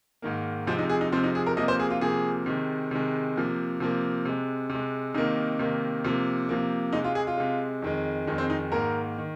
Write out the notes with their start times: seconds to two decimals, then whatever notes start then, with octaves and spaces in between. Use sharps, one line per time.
0.22 G#2 D#3 A#3
0.67 C3 F3 G#3 C4
0.78 D#4
0.89 G#4
1.01 D#4
1.12 C3 F3 G#3 C4
1.24 D#4
1.35 G#4
1.46 A#4
1.57 C3 F3 A#3 D#5
1.68 C5
1.80 G#4
1.90 F4
2.01 C3 F3 A#3 G#4
2.46 C3 D#3 G#3
2.91 C3 D#3 G#3
3.36 C3 F3 A#3
3.80 C3 F3 A#3
4.25 C3 G#3
4.69 C3
4.75 G#3
5.14 C3 D#3 A#3 D#4
5.59 C3 D#3 A#3
6.04 C3 F3 A#3
6.49 C3 F3 A#3
6.93 C3 G#3 D#4
7.04 F4
7.15 G#4
7.27 F4
7.37 C3 G#3
7.82 F2 D#3 G#3
8.27 F2 D#3 G#3
8.38 C4
8.50 D#4
8.72 G#2 D#3 A#3 A#4
9.18 D#3